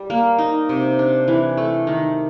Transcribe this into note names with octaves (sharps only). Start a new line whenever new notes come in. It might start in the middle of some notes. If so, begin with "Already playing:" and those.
Already playing: G3
A#3
D#4
C3
D4
E3
A3
D#3